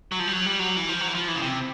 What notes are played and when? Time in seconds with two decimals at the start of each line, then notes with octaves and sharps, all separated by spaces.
0.12 F#3
0.19 F3
0.28 G3
0.33 F#3
0.46 G3
0.59 F#3
0.77 E3
0.89 F3
1.01 F#3
1.08 E3
1.15 F3
1.28 E3
1.35 C#3
1.42 C3